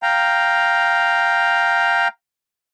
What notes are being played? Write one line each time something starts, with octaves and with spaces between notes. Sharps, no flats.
F5 G5 A#5